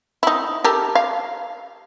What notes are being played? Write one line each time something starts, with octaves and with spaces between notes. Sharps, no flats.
D#4 E4
G4 A4 A#4
F5